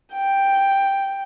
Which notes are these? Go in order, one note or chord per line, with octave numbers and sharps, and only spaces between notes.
G5